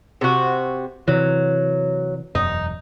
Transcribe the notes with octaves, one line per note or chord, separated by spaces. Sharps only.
C3 F#4
C3 E3 F#3
E1 F#2 D#4